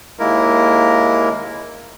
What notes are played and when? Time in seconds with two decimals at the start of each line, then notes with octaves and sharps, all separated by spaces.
0.19 D#2 G#3 A#3 E4 A#4